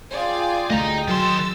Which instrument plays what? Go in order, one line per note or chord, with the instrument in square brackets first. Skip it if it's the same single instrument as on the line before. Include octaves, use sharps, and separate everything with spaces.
[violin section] F4 D5 G#5 [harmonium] G#4 G5
[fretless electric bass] D2 A3 [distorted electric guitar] D#5 A#5
[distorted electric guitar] D#3 C6 [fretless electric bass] F#3 [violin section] E6 A6